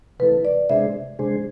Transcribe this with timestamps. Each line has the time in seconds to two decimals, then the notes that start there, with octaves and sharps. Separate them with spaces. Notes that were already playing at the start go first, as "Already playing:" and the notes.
0.19 C3 E3 A3 E4 A4 B4
0.45 D5
0.69 C3 G#3 D4 G#4 C5 E5
1.19 C3 G#3 D4 G#4 C5